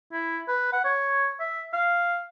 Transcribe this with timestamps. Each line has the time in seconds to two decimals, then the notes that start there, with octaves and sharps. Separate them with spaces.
0.13 E4
0.48 B4
0.73 F#5
0.84 C#5
1.40 E5
1.73 F5